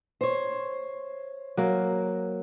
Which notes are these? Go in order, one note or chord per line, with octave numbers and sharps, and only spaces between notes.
C5 C#5
F#3 A#3